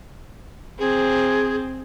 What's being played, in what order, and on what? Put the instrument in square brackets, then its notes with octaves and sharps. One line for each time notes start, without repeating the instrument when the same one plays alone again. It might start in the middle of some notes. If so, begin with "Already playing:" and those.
[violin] C4 [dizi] G#4